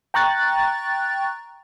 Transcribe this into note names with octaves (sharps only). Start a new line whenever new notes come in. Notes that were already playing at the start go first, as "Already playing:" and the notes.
G5 A#5 C#6 F#6 A6